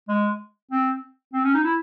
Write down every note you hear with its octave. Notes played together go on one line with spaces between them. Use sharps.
G#3
C4
C4
C#4
D#4
E4